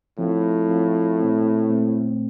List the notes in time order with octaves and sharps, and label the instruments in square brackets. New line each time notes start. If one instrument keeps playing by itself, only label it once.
[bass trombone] A2 [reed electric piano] F3 C4 F4
[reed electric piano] F3 C4 F4
A#2 A3 C4
A#2 A3 C4